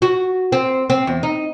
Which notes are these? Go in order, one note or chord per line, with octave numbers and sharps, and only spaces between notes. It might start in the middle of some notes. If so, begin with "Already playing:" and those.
F#4
C4
C4
E2
D#4